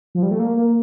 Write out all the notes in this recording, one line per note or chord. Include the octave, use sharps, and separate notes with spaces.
F3
G3
A3
A#3
A#3